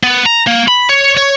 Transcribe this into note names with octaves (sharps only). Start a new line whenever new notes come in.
B3
A#5
A#3
B5
C#5
C#5